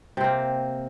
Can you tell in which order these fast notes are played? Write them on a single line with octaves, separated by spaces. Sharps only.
C3 C4 A#3